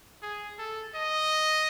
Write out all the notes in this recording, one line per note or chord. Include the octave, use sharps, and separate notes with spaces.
G#4
A4
D#5